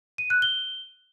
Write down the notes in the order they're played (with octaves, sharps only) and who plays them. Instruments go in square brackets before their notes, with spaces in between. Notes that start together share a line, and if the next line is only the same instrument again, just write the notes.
[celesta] D#7
F#6
G7